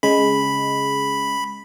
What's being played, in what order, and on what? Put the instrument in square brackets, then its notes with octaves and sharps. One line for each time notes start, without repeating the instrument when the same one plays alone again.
[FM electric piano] C#3 G#3 [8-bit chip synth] B5